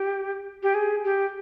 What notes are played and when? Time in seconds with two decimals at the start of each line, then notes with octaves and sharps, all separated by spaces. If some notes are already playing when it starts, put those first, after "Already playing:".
Already playing: G4
0.63 G4
0.74 G#4
1.04 G4